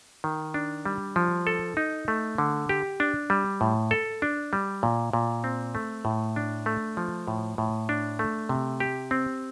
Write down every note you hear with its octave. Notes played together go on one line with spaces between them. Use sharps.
D#3
D4
G3
F3
A4
D#4
A3
D3
G4
D4
G3
A2
A4
D4
G3
A#2
A#2
C4
A3
A2
D4
A3
F3
A2
A2
D4
A3
C3
G4
C4